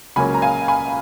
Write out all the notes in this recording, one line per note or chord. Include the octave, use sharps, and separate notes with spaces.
C#2 C#3 F#3 A#3 C#4 G#5 B5
A#5
F5 G#5
G#5 B5